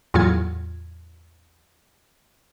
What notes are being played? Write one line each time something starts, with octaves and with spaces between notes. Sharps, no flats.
E2 A2 F#3 F4 G#6